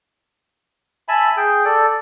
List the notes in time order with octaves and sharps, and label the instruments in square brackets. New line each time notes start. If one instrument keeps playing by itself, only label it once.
[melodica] E5 G#5 A5 B5
G#4 G5
A4 D5